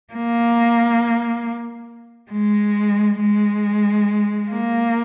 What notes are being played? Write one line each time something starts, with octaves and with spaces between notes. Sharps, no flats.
A#3
G#3
G#3
A#3